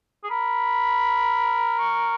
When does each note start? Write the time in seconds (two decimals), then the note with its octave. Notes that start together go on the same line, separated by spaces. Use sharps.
0.24 G#4
0.30 A#4 B5
1.79 C#6